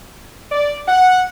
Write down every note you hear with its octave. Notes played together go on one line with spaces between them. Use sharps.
D5
F#5